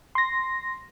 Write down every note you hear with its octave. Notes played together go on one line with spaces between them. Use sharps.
C6 A#6